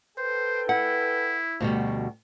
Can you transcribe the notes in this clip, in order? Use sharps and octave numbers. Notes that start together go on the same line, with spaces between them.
A4 B4 C5 G5
E4 F#5
D2 B2 G3